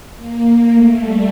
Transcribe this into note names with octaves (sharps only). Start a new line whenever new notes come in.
A#3
A3
G3